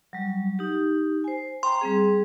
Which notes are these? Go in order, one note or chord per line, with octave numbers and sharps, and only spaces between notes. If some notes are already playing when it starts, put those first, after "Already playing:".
F#3 G3
D#4 G4
C5 G#5
G5 A#5 C6
G3 C4 G#4